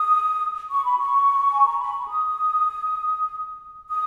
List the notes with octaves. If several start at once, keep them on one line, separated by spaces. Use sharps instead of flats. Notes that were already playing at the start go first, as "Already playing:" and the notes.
Already playing: D#6
C#6
B5
C#6
G#5
A#5
B5
C#6
D#6
D#6